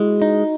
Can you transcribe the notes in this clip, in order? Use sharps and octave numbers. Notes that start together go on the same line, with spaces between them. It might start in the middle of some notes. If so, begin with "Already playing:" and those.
Already playing: G#3 E4 F#4
D#4